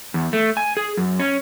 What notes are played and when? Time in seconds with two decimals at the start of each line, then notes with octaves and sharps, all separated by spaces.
0.14 E2
0.33 A3
0.57 G#5
0.77 G#4
0.97 F#2
1.20 C#4